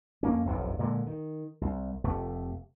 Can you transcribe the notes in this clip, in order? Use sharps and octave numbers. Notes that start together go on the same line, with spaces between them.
F2 A#3 C#4
F1 B1 F#2 C3
A#2 D3 G#3
D#3
C2
F1 C3 A3